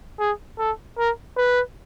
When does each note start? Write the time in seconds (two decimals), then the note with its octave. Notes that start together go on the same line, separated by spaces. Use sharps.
0.19 G#4
0.59 A4
0.98 A#4
1.36 B4